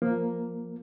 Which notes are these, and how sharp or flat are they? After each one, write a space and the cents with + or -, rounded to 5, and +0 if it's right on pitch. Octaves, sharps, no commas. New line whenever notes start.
F3 +0 A#3 +0